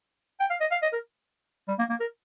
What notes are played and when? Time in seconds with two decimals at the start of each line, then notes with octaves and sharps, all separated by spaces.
0.40 G5
0.50 F5
0.61 D#5
0.71 F5
0.82 D#5
0.93 A#4
1.68 G3
1.79 A#3
1.90 A#3
2.00 A#4